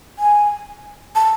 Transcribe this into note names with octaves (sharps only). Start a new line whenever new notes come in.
G#5
A5